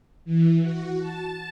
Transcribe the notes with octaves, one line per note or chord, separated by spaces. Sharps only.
E3
F#4
A5